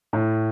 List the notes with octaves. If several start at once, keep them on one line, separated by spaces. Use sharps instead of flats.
A2